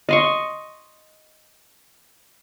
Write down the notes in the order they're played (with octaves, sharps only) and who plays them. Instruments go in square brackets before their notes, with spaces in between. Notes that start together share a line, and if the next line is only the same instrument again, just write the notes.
[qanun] D#5 C6 C#6